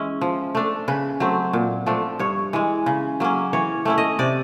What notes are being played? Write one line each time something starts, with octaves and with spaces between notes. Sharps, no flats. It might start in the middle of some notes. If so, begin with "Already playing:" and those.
Already playing: E3 G#3 C#4 E4
F3
A3 D4
C#3 B4
F#3 A3 C4
A#2
F3 A3 D4
G2 C#5
E3 G#3
C#3
F#3 A#3 C#4
E3 C#5
A3 C#4 E4
D#5
C3 D5